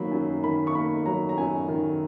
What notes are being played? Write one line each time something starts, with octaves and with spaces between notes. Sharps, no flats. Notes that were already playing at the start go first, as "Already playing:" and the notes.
Already playing: D#3 F#3 A#3 B5
F#2
D#3 B5
C#6
A#3 B5
F#3 A#5
A#5
F#2 G#5
D#3